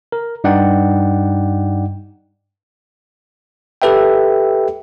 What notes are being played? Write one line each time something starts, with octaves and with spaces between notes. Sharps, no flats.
A#4
G2 D#4 D5 F#5 G5
G4 A4 B4 E5 G5